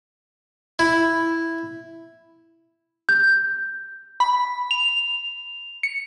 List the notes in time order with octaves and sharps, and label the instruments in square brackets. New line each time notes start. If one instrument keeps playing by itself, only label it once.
[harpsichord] E4
[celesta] G6
[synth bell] B5
F7
C#7